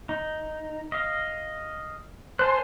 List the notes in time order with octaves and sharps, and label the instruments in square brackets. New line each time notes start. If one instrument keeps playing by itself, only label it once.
[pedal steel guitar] D#4
D#5 F5
[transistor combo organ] C5 [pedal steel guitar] G#5 A5 F#6